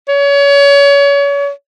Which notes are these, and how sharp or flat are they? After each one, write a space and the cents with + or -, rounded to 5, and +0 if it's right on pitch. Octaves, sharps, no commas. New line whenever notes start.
C#5 +30